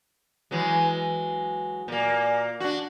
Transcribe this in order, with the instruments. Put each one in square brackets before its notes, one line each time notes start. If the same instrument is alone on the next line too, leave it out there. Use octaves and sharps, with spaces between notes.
[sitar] E3 F#3 G#3
A#2 A#3
D4 F#4